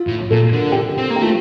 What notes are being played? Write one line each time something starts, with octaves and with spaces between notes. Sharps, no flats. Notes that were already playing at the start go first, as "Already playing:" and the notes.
Already playing: F4
A2
A#2 A4
D3 A#4
G4
A4
C4
A#3
G4
A3 F4